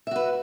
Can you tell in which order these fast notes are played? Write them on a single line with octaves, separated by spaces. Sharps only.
E5 F#4 B4